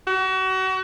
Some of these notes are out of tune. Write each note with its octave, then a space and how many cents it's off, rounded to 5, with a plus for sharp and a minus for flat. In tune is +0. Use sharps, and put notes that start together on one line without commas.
F#4 +30